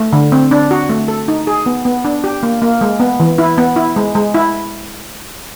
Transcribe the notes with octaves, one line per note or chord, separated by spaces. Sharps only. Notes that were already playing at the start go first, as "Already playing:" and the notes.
Already playing: A3
D3
C4
D4
F#4
A3
A4
D#4
G#4
B3
B3
D4
G4
A#3
A#3
G#3
B3
E3
E4
B3
E4
G#3
G#3
E4